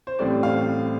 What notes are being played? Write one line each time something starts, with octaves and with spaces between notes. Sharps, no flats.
C5
A1 A2 G3 C4 D5
F5